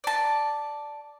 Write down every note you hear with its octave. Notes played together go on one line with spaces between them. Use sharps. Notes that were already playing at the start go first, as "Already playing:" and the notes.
D5 A5